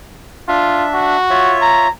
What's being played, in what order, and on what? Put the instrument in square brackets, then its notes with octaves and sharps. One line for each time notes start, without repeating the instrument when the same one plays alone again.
[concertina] D4 E5 [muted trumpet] F4
[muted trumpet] F#4
[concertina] F4 C#5 E5
[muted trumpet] A#5